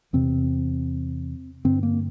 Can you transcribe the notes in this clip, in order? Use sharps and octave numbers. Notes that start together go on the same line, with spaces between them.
E2 C3 C4
G2 D3 C4
A#3